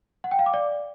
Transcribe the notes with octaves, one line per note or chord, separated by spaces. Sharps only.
F#5
G5
F5
D6
D5